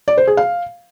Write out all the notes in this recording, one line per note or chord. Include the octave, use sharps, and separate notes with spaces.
D5
C5
G#4
F5